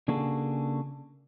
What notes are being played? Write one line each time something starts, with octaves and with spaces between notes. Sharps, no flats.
C#3 A#3 D4 F#4 G#4 A4